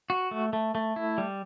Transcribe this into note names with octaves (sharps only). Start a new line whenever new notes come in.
F#4
A3
A3
A3
E4
G3